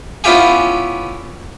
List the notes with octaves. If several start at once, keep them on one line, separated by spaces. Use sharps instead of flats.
B3 C#4 E4 F4 G4 G#4